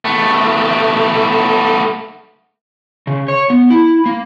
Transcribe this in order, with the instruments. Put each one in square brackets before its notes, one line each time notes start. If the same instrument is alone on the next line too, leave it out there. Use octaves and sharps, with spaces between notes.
[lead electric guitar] A3 B3
[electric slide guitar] C#3
C#5
B3
E4
A#3